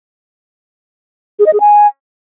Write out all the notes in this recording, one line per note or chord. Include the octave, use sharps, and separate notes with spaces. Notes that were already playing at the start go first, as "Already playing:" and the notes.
G#4
D#5
G#4
G#5